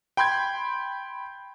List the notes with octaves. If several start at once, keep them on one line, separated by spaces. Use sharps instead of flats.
G5 B5 C6 G6 G#6